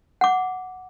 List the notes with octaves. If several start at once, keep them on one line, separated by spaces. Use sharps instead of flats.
F#5 D6